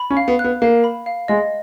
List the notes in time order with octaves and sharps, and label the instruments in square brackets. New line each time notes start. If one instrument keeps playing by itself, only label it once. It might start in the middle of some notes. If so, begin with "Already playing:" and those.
Already playing: [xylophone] B5
[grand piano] C#4
[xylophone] F5
[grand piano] B3
[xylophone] F#6
[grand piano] B3
[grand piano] A#3 [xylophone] F5
[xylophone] B5
F5
[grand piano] G#3 [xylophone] D#5